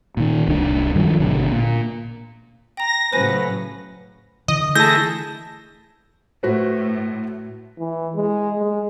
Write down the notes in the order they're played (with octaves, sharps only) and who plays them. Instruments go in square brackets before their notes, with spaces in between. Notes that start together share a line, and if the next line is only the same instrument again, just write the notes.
[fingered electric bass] A#2 D#3
D1 C2 C#3 D4
G2 D#3 F3 F#3
G#1 B2 D3
A#2
[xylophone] G5 A#5 [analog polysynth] A#6
[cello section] A2 C#3 F#3 [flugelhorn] B4 [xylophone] C5 G#5
[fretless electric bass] D3 E3 [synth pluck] D#5
[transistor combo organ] A3 E4 G#4 [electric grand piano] A5 G6 [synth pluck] A#6
[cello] A2 [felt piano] F#4 B4 C5
[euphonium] E3
G#3
G#3